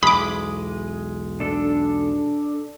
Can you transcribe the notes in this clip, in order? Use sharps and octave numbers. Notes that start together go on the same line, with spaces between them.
B1 E2 G#3 B5 D6 D#6
D4 A4